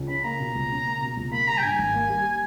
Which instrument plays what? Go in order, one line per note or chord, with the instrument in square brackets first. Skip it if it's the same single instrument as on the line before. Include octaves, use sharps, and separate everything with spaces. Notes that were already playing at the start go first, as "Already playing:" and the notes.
Already playing: [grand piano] C#2
[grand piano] C#4 [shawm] B5
[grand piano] A#3 [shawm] A#5
[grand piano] B2
C#2
C#4
A#3
B2
C#2
[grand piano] A#3 [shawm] B5
[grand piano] G3 [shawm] A#5
[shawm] G5
[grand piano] G2 [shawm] G#5
[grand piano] G#1
A#3
G3